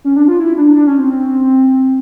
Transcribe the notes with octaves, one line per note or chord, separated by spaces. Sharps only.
C#4
D4
F4
E4
D4
D4
C#4
C4
C4